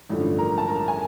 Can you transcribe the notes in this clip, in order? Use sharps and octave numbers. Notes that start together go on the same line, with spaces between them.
A1 G2 D3 F3 A3
A#4 A#5
A5
A#4 A#5
G#5